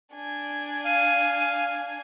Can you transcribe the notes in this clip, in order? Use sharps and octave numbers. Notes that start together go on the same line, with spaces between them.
D4 G#5
F5 D#7